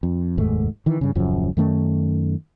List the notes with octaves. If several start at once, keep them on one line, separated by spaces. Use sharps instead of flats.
F2
F1 D#2 G#2 A3
D#3 E3
G2 C#3
D#1 F#2 C#3 F3
F#2 D#3 A3 C#4